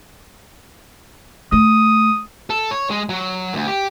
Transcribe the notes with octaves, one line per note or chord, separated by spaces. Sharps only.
A3 D#6
A4
C#5
G#3
F#3
D2
G4